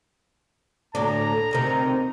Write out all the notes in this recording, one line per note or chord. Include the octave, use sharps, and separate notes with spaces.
D2 A2 D4 A#5
D2 C3 D#3